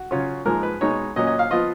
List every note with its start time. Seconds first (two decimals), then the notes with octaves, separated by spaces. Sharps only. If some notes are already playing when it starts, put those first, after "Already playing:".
Already playing: F#4
0.11 C#3 F#3 C#4 F4
0.45 G#2 F3 G#3 A#4
0.63 B4
0.81 B2 G#3 D#4 C#5
1.16 A#2 F#3 C#4 D#5
1.27 D#5
1.39 F5
1.51 F3 B3 F4 D#5